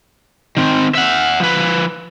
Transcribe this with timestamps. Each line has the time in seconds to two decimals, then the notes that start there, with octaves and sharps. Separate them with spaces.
0.57 D#3 C4
0.95 E5 F#5
1.40 F3 B4